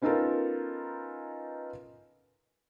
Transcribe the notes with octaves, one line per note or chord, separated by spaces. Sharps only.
B3 C#4 D#4 F4 A4 A#4